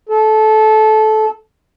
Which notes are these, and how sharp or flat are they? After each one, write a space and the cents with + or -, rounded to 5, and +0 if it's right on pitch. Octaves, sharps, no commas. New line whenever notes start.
A4 -20